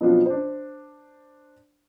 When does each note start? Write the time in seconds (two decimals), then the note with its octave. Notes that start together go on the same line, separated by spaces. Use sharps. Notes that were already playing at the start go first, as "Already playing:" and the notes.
0.01 B2 F3 F#3 C4 D4 F4
0.26 D4 C5